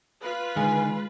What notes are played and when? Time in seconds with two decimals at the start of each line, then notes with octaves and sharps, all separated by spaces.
0.22 F4 B4
0.57 D3 D#3 G#3 G#5